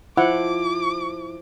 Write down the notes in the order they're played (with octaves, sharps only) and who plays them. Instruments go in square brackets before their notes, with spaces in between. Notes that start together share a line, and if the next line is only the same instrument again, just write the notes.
[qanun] F3 [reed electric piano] E4 [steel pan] F#5 [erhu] D6